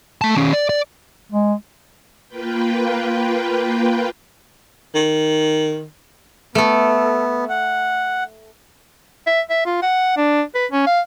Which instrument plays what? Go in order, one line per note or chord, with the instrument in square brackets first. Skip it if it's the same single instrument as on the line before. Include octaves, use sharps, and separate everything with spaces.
[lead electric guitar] A3 A5
D#3 C#4
D5
D5
[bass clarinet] G#3
[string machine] A#3 F4 B4 G5
[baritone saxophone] D#3
[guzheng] A3 A4 [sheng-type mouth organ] B3
[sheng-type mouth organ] F#5
[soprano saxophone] E5
E5
F4
F#5
D4
B4
C#4
F5